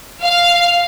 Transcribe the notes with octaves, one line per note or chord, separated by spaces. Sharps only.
F5